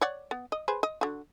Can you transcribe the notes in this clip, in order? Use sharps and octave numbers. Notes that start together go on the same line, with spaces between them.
C#5 D5 F#5
B3
D#5
G#4 B4 C5
D#5
D3 F#4